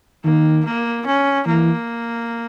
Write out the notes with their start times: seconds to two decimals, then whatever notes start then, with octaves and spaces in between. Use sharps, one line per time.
0.24 D#3 A#3
0.65 A#3
1.06 C#4
1.47 E3 A#3